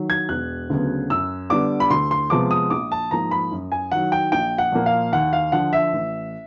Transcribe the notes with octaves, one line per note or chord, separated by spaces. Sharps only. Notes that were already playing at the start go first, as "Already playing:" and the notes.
Already playing: D#3 F#3
G#6
E1 F#6
D2 C#3 F#3 B3
F#2 E6
D3 G3 B3 D6
B5
D2 C6
C6
C3 F3 G#3 B3 D6
D#6
A#1 D6
A5
G#2 F3 A#3 A#5
B5
F#2
G#5
D#3 F#3 F#5
G5
A#1 G5
F#5
A#2 F3 A#3
F5
D#2 F#5
F5
D3 F3 F#5
E5
A1